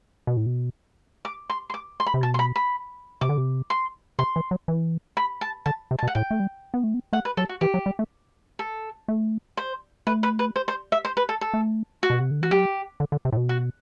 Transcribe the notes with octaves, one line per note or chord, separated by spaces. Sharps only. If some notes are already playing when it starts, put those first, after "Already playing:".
B2
A2
B2
D6
C6
C6
D6
C6
B5
C3
B2 A5
C6
B5
B5
C3 D6
D3
C3
C6
C3 C6
E3
F#3
E3
B5
A5
D3 A5
C3
A5
B2
F#5
A2 G5
A3
G3
B3
A3
B3
A3 F#5
B4
F#3 A4
F#4
E3 G4
F#3
G3
A3
A4
A3
C5
A3 B4
B4
B4
C5
C5
E5
C5
B4
A4
A4
A3
F#4
B2
C3
D3
E3 F#4
F#3 G4
D3
D3
C3
A2
B2
F#4